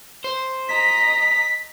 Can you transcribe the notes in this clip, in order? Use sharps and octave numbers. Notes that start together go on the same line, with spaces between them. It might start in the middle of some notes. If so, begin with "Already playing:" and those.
C5
D#5 A#5 B6